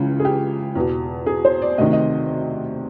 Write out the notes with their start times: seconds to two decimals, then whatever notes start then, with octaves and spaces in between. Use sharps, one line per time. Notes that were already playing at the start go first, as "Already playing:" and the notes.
Already playing: C#2 C#3 E3
0.20 G#4
0.25 G4
0.75 E2 B2
1.26 G#4
1.45 C5
1.62 D5
1.78 D2 C3 D#3 D#5
1.93 D#5